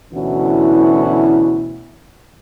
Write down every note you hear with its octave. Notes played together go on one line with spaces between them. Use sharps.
D2 B2 E3 C#4 E4 F#4